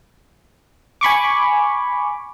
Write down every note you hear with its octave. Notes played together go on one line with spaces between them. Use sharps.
G#5 B5 C#6 D6